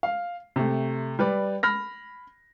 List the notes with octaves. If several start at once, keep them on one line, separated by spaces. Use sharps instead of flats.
F5
C3 A3
G3 B4 D5
B5 F6 A#6